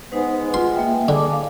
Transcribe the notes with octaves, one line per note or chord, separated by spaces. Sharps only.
G#3 B3 D#4 B4 C5
F4 C6
A#3 E5 G5
D3 G3 G#3 G#4 A5 D6
A2 F5